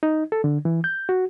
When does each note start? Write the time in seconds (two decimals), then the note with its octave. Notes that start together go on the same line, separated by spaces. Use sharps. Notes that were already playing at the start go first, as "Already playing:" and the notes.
0.03 D#4
0.32 A4
0.44 D3
0.65 E3
0.84 G6
1.09 F#4